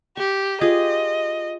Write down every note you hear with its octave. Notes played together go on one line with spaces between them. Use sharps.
G4 C#6
F4 G4 G#4 D#5